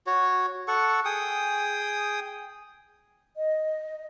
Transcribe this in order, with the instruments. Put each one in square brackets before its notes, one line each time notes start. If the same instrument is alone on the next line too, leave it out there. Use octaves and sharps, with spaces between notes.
[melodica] F#4 C#5
A4 F#5 C#6
G#4 G5 D#6
[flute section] D#5